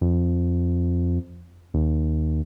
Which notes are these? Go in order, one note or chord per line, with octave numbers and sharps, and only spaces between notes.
F2
D#2